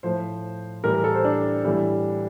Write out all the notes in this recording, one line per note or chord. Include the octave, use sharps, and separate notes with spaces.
A2 F3 C5
A2 E3 G3 A#4
A#4
A4
C5
D4
A2 E3 G3